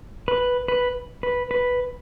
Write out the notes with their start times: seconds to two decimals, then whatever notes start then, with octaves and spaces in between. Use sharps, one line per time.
0.28 B4
0.68 B4
1.23 B4
1.51 B4